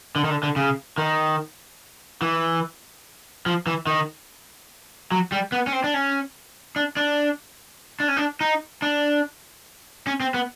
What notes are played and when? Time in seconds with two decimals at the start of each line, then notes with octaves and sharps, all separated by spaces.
0.16 D3
0.24 D#3
0.30 D3
0.43 D3
0.56 C#3
0.98 D#3
2.22 E3
3.46 F3
3.67 E3
3.87 D#3
5.12 F#3
5.32 G3
5.52 B3
5.67 C#4
5.73 C4
5.84 D4
5.94 C#4
6.76 D4
6.97 D4
8.00 D4
8.08 C#4
8.17 D4
8.41 D#4
8.82 D4
10.07 C#4
10.20 C4
10.34 B3